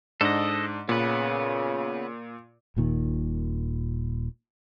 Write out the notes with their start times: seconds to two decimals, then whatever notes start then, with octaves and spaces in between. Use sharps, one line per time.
0.21 G#2 D4 A4 D#5
0.89 A#2 C#3 B3 B4
2.76 D#1 A#2 D#3